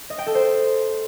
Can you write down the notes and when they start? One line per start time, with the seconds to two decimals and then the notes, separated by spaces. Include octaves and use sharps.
0.10 D#5
0.18 G5
0.27 A4
0.35 C5